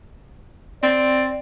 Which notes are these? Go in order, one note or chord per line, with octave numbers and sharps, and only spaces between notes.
C4 D5